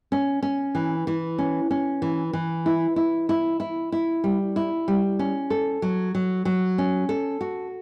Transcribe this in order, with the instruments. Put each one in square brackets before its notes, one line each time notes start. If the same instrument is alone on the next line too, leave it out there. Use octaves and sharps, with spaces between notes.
[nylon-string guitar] C#4
C#4
E3
E3
C#4
C#4
E3
E3
E4
E4
E4
E4
E4
G3
E4
G3
C#4
A4
F#3
F#3
F#3
C#4
A4
F#4